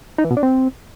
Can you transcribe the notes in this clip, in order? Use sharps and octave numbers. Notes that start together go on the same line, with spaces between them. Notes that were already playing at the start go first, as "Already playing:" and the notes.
D#4
E3
B2
D4
C4